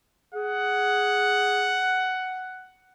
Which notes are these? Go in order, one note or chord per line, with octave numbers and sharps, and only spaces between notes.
G#4 F#5